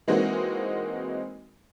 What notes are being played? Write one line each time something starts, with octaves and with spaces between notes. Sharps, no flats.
E3 G#3 A#3 C4 D#4 F#4